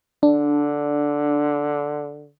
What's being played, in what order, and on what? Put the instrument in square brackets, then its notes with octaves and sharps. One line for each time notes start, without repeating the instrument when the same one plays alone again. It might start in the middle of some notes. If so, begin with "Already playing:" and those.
[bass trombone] D3 [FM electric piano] D4